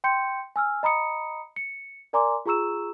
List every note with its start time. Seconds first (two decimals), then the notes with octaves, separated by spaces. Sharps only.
0.04 G5 C6 G6 C#7
0.56 G#5 E6 F6
0.83 D#5 A#5 B5 D#6 C#7
1.56 C#7
2.13 A#4 D5 G#5 A#5 C6 D6
2.46 F4 G#4 A#5 C#6 E6 E7